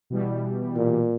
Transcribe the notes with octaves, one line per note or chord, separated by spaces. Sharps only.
B2 E3 G3
A#2